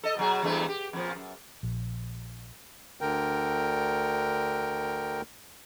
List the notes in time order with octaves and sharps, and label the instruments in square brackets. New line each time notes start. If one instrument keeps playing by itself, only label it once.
[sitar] A4 D#5
B2 F#3 G#4
E2 G2 A3
G4
F2 A#2 F3
F#2
[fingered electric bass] A#1
[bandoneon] D2 D3 A#4 G5